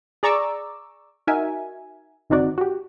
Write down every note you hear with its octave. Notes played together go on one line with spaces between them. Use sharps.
G#4 D5 A#5 C#6 D6 E6
D#4 F#4 A#4 E5 G#5
G1 D#3 C4 D#4 F#4 D5
F#4 G4